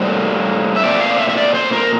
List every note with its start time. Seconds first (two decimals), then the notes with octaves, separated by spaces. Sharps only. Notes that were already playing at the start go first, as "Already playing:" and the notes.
Already playing: A2 G3 A#3 C5
0.76 E5
0.83 A#2 A3 C4 D5
1.01 F5
1.11 D5
1.19 E5
1.29 E5
1.37 D5
1.55 C5
1.73 A#4